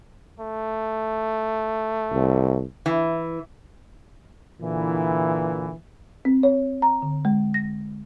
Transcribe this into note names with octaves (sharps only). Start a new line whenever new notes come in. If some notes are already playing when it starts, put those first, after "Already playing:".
A3
C2
E3
A#2 D3 E3
C4
C#5
A#5
D3
G#3
A#6